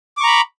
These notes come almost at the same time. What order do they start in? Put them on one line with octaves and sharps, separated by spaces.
D6 C#6 A#5 B5